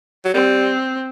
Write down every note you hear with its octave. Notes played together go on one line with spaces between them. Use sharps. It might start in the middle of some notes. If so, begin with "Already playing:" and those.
F#3
G3 C4